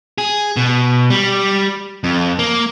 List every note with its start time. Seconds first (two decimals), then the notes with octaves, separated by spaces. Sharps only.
0.18 G#4
0.57 B2
1.10 G3
2.04 F2
2.39 A#3